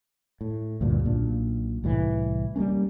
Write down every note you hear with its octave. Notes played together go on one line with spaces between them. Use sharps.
A2
D2 G2 A#2
B1 A#2 D4
C2 A2 E3
G3 G#3 A#3 C#4